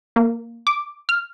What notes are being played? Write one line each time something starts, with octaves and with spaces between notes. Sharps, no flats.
A#3
D6
F6